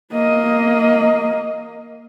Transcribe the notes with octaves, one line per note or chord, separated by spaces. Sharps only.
A#3 D#5